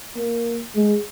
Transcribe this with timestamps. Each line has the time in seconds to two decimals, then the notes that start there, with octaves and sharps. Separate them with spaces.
0.17 A#3
0.75 G#3